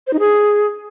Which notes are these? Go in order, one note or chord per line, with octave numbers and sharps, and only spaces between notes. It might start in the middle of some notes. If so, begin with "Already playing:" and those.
C5
D#4
G#4